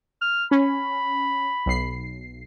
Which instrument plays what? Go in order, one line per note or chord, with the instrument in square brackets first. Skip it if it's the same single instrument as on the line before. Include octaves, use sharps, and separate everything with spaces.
[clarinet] F6
[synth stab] C#4 [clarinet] B5
[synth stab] B1 C7